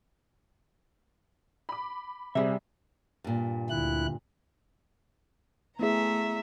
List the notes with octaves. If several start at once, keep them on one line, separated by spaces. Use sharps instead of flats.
B5 D6
C3 G3 G#4 E5
G2 A#2
D2 E4 F#6
A3 B3 E4 G#4 E5 A#5